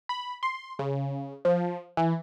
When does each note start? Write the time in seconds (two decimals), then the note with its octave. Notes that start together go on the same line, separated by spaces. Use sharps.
0.09 B5
0.43 C6
0.79 C#3
1.45 F3
1.97 E3